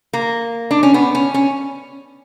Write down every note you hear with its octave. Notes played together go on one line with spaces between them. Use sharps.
A#3
D4
C#4
B3
C#4
C#4